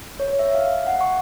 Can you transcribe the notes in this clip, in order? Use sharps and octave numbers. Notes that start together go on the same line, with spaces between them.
C#5
E5
F5
F#5
C#6